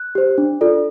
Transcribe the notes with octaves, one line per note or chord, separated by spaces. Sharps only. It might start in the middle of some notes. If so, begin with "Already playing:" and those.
Already playing: F#6
G4 C5
D4
F4 A4 D5